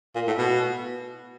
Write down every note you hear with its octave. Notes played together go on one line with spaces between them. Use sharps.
A#2
A2
B2